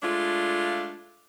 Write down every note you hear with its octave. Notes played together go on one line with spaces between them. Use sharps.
G#3 A3 D4 F4